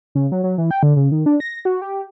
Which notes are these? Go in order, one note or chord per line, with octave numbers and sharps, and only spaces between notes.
C#3
F#3
F#3
E3
G5
D3
C#3
D#3
D4
A#6
F#4
G4